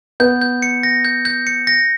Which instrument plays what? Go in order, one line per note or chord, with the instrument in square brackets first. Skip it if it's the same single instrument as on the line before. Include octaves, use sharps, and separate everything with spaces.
[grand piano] B3 [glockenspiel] G6
[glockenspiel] G6
C#7
A#6
G6
G6
C#7
A#6